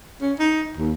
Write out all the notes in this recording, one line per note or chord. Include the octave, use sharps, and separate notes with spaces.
C#4
D#4
D#2